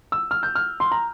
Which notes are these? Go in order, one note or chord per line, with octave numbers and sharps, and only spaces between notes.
E6
F6
G6
F6
C6
A#5